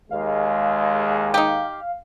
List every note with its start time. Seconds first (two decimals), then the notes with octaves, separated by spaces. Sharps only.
0.10 D#2 G#3 F5
1.34 D#4 G4